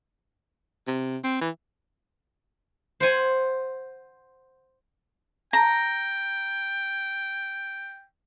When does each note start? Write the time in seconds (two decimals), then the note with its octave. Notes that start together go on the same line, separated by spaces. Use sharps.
0.88 C3
1.24 C4
1.41 E3
3.00 C5 F#5 G#5
5.53 G5 A#5